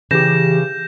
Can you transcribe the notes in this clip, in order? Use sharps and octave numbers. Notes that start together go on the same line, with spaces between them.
C#3 E3 G4 G6 A#6 E7